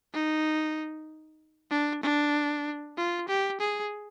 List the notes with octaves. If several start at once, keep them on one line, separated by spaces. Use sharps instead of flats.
D#4
D4
D4
F4
G4
G#4